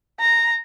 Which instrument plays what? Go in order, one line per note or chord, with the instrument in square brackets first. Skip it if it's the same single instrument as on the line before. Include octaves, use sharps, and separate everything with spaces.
[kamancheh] A#5